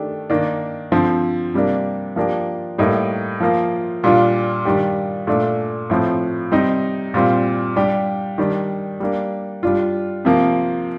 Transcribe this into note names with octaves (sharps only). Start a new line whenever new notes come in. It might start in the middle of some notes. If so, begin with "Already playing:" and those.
Already playing: D#3 A3 D4 G4
D#3 A#3 D4
D3 F3 C4
C3 G3 A#3 D4
F3 A#3 D4 G4
A2 G3 A#3 D#4
F3 A#3 F4
A#2 G3 D4 F4
D#3 G3 D4 G4
A#2 A3 D4
A2 F3 C4
C3 G3 C4 D#4
A#2 G3 C4 F4
G3 D4 G4
D#3 G3 D4
G3 A#3 D4
G3 D4 F4
C3 F3 A#3